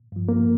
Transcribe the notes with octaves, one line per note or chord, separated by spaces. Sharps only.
G2 F3
A#3